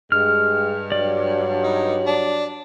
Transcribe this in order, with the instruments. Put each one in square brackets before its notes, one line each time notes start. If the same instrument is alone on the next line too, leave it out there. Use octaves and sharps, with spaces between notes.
[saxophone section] G2 [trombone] G#3 [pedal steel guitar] F6
[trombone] F#3 [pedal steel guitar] D5
[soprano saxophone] D#4
D4